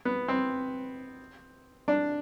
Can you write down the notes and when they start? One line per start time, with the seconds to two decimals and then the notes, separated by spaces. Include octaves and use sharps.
0.05 B3
0.28 C4
1.88 D4